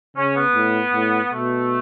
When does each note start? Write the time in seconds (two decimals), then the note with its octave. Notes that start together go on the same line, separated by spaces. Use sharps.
0.16 C#3 C#4
0.36 B3
0.55 A2
0.94 A2
1.31 B2 A3